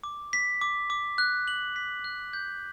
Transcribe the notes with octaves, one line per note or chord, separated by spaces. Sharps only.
D6
B6
D6
D6
F#6
F#7
B6
F#6
G6